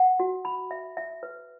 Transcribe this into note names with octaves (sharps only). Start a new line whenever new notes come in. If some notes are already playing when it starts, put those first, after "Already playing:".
Already playing: F#5
F#4
B5
E5
E5
B4